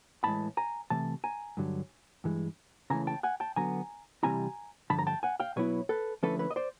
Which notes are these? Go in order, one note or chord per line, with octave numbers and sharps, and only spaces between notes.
A2 E3 G#3 A5 B5
G#5 A#5
C3 E3 A3 A5
G#5 A#5
G2 D3 F#3
G2 E3 G#3
C#3 E3 A3 G#5 A#5
G5 A5
F#5 G#5
G5 A5
D3 F#3 B3 G#5 A#5
C3 E3 G3 C4 E4 G#5 A#5
G2 D3 F3 A5 B5
A#5
G5 A5
F#5 G#5
F5 G5
B2 F#3 B3 E4 B4 C#5
A4 B4
D3 F3 A3 C#4 E4 A4 B4
B4 C#5
D#5
C5 D5